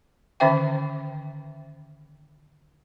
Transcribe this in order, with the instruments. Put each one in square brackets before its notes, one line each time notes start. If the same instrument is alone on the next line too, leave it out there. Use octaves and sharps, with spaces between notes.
[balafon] D3 D#3 C#4 C5 E5 G5